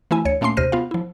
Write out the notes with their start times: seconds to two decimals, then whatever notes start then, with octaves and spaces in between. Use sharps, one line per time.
0.11 E3 A3 E4 G#5
0.25 D2 C#5 C#7
0.41 A#2 A3 A#3 C#4 C6 C7
0.57 D#2 C3 C5 F6 A#6 D#7
0.72 B3 F4 F5
0.91 F3 E4